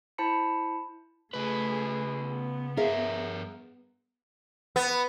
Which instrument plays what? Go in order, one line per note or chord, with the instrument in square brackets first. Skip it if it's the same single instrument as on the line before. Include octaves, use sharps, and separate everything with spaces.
[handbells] E4 C5 A5 B5 C#7
[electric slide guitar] C#3 B4 [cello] A3 G#4
[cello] B3
[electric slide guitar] G2 A#4 [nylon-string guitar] G#4 E5 F5
[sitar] B3